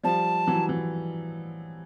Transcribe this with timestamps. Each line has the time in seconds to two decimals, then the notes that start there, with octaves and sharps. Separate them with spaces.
0.04 F3 G3 A5
0.47 E3 F#3
0.69 E3 F#3